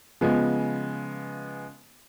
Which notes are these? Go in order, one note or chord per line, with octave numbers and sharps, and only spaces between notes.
C#3 F3 G#3 B3